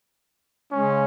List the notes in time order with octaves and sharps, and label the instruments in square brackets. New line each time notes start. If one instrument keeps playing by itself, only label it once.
[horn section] C#3 G#3 C#4